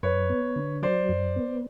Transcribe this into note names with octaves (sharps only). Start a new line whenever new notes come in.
F#2 B4 C#5
B3
D3
F#3 C5 D5
F#2
B3